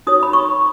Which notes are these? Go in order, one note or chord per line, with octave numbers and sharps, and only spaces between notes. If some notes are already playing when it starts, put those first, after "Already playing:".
D#4 F#4 C#5 D#6
B5
C#6